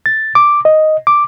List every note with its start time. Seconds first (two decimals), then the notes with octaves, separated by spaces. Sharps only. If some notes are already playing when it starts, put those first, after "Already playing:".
0.06 A6
0.35 D6
0.65 D#5
1.07 D6